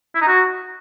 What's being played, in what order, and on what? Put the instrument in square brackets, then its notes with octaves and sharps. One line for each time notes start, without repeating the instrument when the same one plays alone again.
[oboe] E4
D#4
F#4